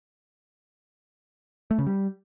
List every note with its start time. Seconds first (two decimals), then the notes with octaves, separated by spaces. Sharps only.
1.71 A3
1.79 C#3
1.87 G3